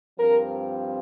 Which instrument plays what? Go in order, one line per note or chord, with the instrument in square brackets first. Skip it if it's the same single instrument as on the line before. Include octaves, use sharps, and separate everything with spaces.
[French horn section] G2 F3 C4 A#4